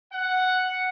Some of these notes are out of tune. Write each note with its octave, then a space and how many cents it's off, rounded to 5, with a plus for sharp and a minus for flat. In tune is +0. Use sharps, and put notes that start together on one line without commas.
F#5 +0